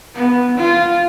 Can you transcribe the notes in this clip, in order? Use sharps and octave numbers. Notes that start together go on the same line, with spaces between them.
B3
F4